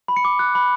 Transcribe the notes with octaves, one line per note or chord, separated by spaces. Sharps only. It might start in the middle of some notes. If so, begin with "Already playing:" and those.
B5
C#7
D6
F#6
B5